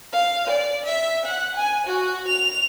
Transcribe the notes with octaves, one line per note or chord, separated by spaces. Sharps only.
F5
D5
E5
F#5
G#5
F#4
F7